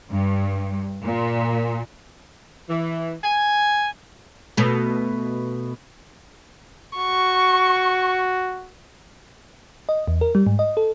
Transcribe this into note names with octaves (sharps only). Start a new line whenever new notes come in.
G2
A#2
E3
G#5
B2 A3
F#4 C#6
D#5
E2
A#4
G3
G#2
D#5
A4